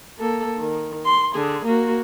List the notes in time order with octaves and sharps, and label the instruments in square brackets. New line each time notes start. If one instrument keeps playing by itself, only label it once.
[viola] A#3 A4
D#3
C6
D3 G#4
A#3 F#4